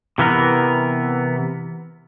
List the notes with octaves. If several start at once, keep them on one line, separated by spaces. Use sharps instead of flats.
C3 E3 B3 A#4